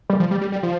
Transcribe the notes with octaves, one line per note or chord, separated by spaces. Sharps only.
G3
F3
G3
G3
G3
F3